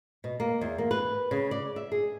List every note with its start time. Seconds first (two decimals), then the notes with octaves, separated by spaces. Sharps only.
0.24 B2
0.40 A#3
0.61 E2
0.78 A#3
0.91 B4
1.31 C#3
1.51 D5
1.76 E5
1.92 G#4